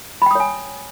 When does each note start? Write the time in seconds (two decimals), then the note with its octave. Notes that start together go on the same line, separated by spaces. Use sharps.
0.22 B5
0.26 G5
0.31 D#6
0.35 C#5
0.40 G#5